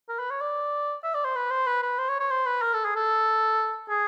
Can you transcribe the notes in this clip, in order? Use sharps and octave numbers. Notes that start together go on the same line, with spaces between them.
A#4
B4
C#5
D5
E5
D5
C5
B4
C5
B4
B4
C5
C#5
C#5
C5
B4
A#4
A4
G#4
A4
G#4